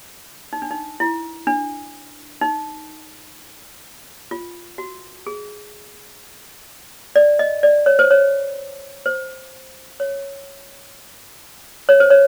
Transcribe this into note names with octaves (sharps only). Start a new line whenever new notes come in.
D#4
D4
D#4
E4
D4
D#4
F4
F#4
G#4
D5
D#5
D5
C#5
C5
C#5
C5
C#5
C#5
C5
C#5